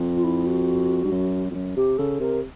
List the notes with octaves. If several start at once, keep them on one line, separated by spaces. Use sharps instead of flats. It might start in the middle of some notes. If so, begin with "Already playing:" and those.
Already playing: F2
F4
E4
F#4
G2
F#2
F2
F#2
C3 G4
C#3 A4
C3 A#4